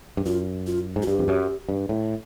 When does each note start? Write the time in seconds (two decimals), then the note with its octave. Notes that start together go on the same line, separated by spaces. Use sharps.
0.17 G2
0.26 F#2 F4
0.67 F4
0.96 G#2
1.02 F#4
1.07 G2 G4
1.19 F2
1.28 F#2
1.69 G2
1.89 A2